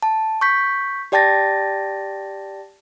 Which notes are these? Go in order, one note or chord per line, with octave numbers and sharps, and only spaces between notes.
A5
C#6 G6 B6
G4 D5 G5 A5 A6 A#6